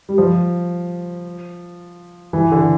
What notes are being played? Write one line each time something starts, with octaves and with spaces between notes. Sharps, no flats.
G3
F3
E3
D3